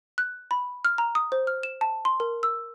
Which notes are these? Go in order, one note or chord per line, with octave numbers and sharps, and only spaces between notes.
F#6
B5
F6
A#5
D#6
C5
F6
E7
A5
C6
A#4
E6